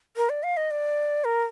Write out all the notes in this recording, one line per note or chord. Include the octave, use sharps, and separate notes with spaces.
A#4
D5
F5
D#5
D5
A#4